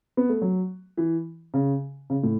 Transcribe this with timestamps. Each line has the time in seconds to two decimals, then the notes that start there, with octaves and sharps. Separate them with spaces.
0.17 B3
0.29 A3
0.42 F#3
0.97 E3
1.54 C#3
2.10 C#3
2.23 A2